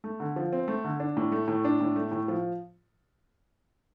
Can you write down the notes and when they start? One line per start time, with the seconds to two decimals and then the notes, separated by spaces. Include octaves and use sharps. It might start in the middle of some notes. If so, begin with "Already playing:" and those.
0.04 A3
0.20 D3
0.36 F3
0.53 C4
0.68 A3
0.84 D3
1.00 D4
1.17 A2
1.32 A3
1.48 A2
1.65 D4
1.80 A2
1.96 A3
2.11 A2
2.28 F3